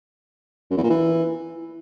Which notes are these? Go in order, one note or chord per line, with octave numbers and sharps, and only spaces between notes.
F#2
E2
A#2
E3